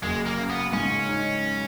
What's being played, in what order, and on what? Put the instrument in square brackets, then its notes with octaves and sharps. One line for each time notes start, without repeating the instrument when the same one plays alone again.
[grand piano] F#1 [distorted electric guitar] G#3
[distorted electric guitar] A#3
[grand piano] C#3
[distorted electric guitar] B3
[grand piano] G#2 [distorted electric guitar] C#4
[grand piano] D#4